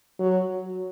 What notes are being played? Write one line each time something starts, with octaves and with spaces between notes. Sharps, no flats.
F#3